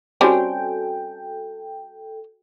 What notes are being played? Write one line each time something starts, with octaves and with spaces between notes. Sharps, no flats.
G3 C4 C#4 F#4 A4 G5 G#5